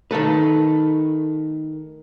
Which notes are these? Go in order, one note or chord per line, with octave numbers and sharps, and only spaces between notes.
D#3 A3 A4 B4